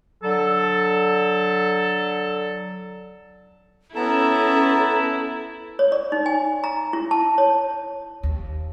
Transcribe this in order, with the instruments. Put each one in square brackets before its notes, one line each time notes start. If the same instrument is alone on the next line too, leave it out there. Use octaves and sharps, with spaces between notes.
[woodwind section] D3 F#3 A4
[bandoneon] B3 A5 [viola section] C#4 A4 [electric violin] E4 [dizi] A#5
[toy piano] C#5
D5
D#4
G#5
A#5
E4
A5
C#5
[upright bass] D#2